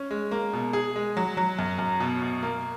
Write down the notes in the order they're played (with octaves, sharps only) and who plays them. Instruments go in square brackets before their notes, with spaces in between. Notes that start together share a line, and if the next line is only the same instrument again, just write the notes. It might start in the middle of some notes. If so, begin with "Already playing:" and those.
Already playing: [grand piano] C#4
G#3
A#3
B2
G#4
G#3
F#3
F#3
F#2
F#2
B2
B2
A#3